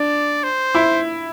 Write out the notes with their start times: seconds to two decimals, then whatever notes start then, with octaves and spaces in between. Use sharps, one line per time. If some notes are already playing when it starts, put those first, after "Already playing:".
Already playing: D4 D5
0.44 C5
0.75 E4